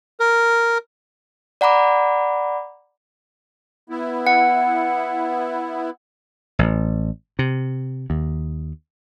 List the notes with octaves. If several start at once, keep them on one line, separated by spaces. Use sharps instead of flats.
A#4
D5 F#5 A#5 B5 D6
B3 E4
F#5
A1
C3
D#2